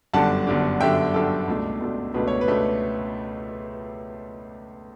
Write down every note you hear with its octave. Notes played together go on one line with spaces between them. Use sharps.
G1 F#2 D3 G3 D4 F#5 A5
G1 F#2 D3 G3 D4
G1 F#2 D3 G3 D4 E5 G5
G1 F#2 D3 G3 D4 A4
C#2 B2 A3 D4
C#2 B2 A3 D4
C#2 B2 A3 D4 B4
C#5
B4
C#2 B2 A3 D4